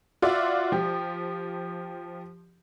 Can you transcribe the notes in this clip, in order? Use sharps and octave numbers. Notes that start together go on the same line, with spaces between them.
F4 F#4 D5 E5
F3 G4